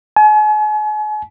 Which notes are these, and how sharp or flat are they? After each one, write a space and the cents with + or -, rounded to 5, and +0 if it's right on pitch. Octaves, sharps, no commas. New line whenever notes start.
G#5 +40